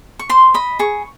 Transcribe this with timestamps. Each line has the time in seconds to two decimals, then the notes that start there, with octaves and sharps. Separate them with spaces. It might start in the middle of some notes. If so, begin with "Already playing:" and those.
0.19 C#6
0.29 C5 C6
0.54 D#5 B5
0.79 G#4 C#6